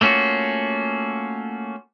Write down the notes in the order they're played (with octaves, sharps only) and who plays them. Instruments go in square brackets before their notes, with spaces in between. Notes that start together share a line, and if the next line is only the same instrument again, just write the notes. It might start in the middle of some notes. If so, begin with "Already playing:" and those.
[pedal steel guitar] A3 A#3 C#4 F4 F#4